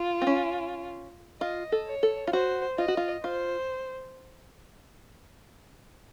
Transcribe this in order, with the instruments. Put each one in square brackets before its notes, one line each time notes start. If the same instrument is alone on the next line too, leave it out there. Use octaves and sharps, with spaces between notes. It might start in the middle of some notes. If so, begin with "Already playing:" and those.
Already playing: [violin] F4
[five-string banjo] C4
C#4
[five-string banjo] F4 [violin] D#5
[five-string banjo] A4
[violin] C#5
[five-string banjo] A4
F4
[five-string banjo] F#4 [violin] C5
[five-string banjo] F4 [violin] D#5
[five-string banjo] F#4
F4
[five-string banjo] F4 [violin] C5